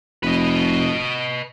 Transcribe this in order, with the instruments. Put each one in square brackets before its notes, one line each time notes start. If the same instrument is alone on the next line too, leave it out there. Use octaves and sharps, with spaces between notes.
[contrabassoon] F1 [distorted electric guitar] B4 D#5